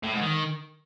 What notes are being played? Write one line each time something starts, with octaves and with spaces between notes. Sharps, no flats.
A2
G#2
D#3